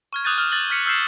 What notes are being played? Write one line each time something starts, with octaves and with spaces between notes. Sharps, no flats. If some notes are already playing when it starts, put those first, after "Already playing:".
C#6 F6 G#6
D6 D#6 F#6 G6 A6 D#7
F6
F#6 A6 F#7
F6 B6 C#7
E6 F6 G6 B6 C7 E7